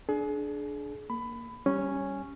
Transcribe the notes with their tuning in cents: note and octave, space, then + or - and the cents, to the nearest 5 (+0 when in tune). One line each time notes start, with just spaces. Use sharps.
D4 +0 G#4 +30
A#3 +0 B5 +15
G3 +0 C#4 +0 G#5 +0